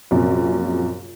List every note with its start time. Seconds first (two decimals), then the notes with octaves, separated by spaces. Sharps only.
0.11 A#1 F#2 C3